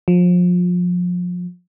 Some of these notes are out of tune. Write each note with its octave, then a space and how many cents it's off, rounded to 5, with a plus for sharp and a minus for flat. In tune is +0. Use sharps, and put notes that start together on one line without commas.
F3 +30